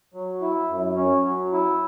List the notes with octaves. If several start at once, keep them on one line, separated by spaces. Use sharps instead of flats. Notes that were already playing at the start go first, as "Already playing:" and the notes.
F#3
E4
F#2
C#4
F#3
E4